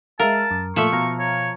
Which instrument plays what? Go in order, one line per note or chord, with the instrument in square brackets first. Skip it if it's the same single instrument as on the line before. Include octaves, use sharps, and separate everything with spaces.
[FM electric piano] G#3 E5 F5 [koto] A#4 [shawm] A5
[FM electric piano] F#2
[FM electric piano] A#2 A3 [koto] F3 E5 [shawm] C#6
[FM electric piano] B2 F5 A#5
[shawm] C#5